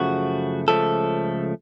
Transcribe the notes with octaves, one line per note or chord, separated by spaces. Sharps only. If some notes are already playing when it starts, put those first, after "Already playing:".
Already playing: F#2 C#3 F3 A3 F#4
C#2 C#3 F3 A3 A4